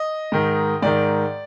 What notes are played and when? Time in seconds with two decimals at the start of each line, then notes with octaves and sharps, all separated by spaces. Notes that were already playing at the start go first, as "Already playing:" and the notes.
Already playing: D#5
0.32 G#2 D#3
0.82 G#2 D#3 D5